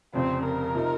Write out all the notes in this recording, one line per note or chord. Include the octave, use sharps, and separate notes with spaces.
F1 F2 C#3 C4
A#4
C3 F3 C4 D#4